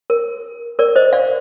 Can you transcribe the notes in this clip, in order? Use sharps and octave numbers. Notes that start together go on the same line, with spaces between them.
A#4
A#4 D5
C5 D#5
D5 F5